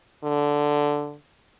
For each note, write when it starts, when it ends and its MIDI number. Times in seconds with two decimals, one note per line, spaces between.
0.24 1.15 50